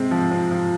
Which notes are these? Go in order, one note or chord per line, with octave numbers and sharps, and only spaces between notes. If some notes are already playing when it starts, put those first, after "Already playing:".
Already playing: C3 G#3 C4
F3
C4
F3